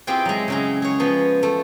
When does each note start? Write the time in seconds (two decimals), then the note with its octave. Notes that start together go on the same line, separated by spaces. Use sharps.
0.07 C4 E4 F4 G4 G#4 G5
0.25 F#3 G#3
0.48 C#3 F#3 G#3
0.82 G#4 C#5
1.00 F3 B3
1.43 A3